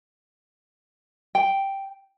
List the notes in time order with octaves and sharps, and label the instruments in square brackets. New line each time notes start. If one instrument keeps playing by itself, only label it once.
[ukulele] G5